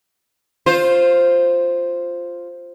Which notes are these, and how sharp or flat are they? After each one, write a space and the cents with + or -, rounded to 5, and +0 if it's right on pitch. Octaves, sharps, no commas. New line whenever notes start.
F4 +0 C5 +0